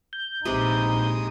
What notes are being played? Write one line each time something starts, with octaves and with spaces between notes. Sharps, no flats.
G6
A#1 C3 G#3 D#4 G4 B4 D#6